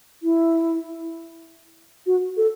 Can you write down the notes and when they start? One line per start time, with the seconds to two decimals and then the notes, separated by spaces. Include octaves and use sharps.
0.23 E4
2.06 F#4
2.37 A4